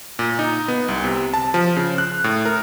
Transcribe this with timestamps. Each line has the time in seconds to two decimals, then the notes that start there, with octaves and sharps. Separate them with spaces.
0.19 A#2
0.39 D#4
0.68 B3
0.88 C2
1.04 C3
1.34 A5
1.54 F3
1.76 C#3
1.98 F#6
2.24 A2
2.45 A#4